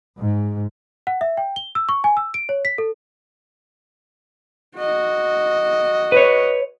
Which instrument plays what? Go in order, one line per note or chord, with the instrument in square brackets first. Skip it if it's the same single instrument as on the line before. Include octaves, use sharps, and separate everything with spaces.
[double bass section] G#2
[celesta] F#5
E5
G5
G7
E6
C#6
G#5
E6
D7
C#5
B6
A4
[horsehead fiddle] F#4 D#5
[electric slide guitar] B4 C#5